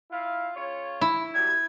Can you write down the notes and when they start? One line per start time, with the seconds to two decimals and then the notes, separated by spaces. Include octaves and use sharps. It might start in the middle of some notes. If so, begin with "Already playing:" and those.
0.11 E4 F4 F5
0.56 C#3 F4 C#5
1.01 E4
1.34 F#3 G3 G4 G#6